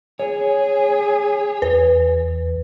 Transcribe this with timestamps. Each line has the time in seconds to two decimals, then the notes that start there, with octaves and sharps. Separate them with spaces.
0.20 G#4 C#5
1.62 E2 B4